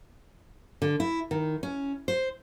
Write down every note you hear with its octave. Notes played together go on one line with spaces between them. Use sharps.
D3
E4
D#3
C#4
C5